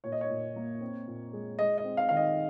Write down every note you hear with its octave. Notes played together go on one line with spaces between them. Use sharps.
A#2 C#5
D#5
C#5
A#2
A#3
C4
A#2
G#3
G#3 D#5
D#5
C4
F5
D#3 F5
D#5